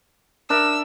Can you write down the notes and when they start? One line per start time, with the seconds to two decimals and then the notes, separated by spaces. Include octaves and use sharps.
0.50 D4 A#4 E5 E6